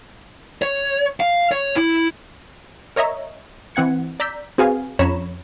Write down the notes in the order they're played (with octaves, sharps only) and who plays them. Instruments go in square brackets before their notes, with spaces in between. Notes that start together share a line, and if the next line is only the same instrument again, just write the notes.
[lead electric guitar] C#5
F5
C#5
E4
[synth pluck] A#4 C#5 D#5 E5 A#5
E3 C4 F#5 G#6 C#7
D5 A#5 E6 G6 B6
C4 F#4 G#4 B4 F5 G#5
F2 C#4 C#5 A#5 B5 E7